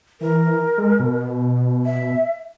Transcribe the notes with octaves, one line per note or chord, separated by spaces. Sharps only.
E3 A#4
G#3
B2
E5